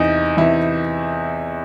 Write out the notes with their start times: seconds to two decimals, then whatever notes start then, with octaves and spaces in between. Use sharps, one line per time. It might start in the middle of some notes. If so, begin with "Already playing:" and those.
Already playing: E2 C3 E3 D#4
0.37 E2 C3 E3 E4